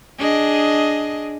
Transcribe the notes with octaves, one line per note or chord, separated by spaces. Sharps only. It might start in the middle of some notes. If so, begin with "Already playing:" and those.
D4 G#4 D#5